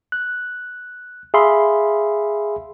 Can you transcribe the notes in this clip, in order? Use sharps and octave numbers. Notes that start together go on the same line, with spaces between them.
F#6
G#4 E5 F5 B5 C6